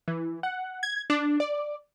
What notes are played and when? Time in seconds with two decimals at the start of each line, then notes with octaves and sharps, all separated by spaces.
0.08 E3
0.43 F#5
0.83 G#6
1.10 D4
1.40 D5